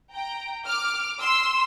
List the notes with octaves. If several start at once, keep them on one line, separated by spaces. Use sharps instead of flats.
G5 A#5
D6 F6
C6 E6